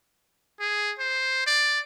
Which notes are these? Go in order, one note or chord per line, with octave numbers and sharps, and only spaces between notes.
G#4
C5
D5